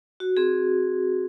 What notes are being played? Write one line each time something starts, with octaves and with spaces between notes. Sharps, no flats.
F#4
C4 G#4